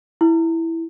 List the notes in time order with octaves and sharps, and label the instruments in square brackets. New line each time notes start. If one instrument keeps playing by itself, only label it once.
[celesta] E4